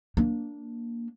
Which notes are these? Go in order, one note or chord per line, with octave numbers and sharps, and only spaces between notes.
A#3 D4